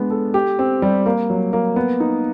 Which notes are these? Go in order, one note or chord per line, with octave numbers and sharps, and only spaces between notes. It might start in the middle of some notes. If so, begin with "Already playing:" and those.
Already playing: G#3 B3 D4
A4
G4
C4
G3
A#3
F#3
A#3
B3
D#4